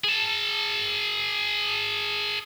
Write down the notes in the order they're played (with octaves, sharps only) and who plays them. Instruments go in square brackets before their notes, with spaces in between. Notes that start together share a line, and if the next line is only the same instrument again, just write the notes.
[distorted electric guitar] G#4 A5